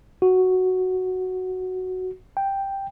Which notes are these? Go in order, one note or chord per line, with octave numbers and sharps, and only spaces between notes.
F#4
G5